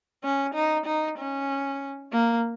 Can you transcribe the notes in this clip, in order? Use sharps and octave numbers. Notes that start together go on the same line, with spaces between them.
C#4
D#4
D#4
C#4
A#3